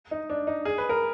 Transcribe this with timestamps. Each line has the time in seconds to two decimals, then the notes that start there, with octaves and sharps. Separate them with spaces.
0.11 D#4
0.30 D4
0.47 D#4
0.65 G#4
0.78 B4
0.89 A#4